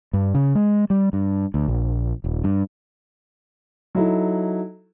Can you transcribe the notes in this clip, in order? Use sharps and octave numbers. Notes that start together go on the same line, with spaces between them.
G2
C#3
G#3
G3
G2
D2
A#1
D#1
G2
F#3 D#4 E4 A4